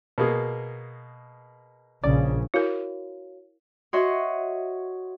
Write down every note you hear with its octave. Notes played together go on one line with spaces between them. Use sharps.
B2 A#3 G#4
A#1 C#3 D5
E4 F#4 A#4 C#5 F5
F#4 C#5 D#5 E5 F#5 C6